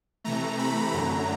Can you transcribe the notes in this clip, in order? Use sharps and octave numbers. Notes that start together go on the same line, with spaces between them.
C3 E3 A3 A#5
B5
F#2 D3 F#3 A3 A#5